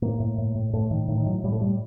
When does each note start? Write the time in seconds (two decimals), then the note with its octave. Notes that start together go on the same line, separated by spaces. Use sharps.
0.02 A2 A#3
0.20 A2
0.38 A2
0.55 A2
0.73 A2 A3
0.91 A2 D#3
1.08 A2 D#3
1.20 D#3
1.26 A2 F#3
1.44 A2 G3
1.52 A3
1.61 A2 G3